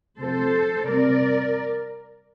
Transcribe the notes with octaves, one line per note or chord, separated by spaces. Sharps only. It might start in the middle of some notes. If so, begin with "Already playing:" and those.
C3 F3 C4 A4 C5
C3 G3 C4 A#4 D5